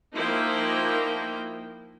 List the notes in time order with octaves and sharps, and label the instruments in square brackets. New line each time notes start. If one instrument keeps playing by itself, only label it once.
[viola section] F3 A#3 D#4 E4 G5